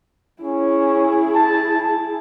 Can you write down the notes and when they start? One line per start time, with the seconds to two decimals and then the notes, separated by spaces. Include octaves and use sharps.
0.42 C#4 E4 G#4
1.35 A5